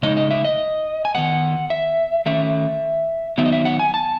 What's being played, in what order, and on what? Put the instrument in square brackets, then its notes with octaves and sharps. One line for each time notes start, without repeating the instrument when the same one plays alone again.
[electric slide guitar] C#3 G#3 D#4 D#5
D#5
E5
D#5
G#5
D#3 G#3 B3 F#5
E5
D#3 A3 C#4 E5
D#3 F#3 B3 D#4 E5
D#5
E5
F#5
G#5
A5